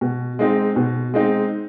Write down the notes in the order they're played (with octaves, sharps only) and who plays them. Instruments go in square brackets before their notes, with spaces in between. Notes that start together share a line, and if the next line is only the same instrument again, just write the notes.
[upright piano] B2
G#3 C4 D#4
B2
G#3 C4 D#4